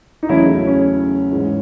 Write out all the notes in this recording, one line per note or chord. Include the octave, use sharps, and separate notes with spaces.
D#4
E2 C#3 F#3 A3 C#4 E4
C#4
G#2 E3 G#3